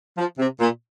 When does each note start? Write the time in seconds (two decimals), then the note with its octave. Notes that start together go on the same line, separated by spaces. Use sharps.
0.18 F3
0.39 C3
0.61 A#2